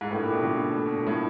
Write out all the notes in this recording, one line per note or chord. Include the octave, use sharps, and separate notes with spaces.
G#2
A2 A3 D4 G4 B4
A#2
B2
D3
B2
A#2
A2